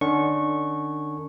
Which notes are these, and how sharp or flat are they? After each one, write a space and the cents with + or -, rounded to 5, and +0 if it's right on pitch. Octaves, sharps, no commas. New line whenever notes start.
D3 +45 C#4 +45 C#6 -10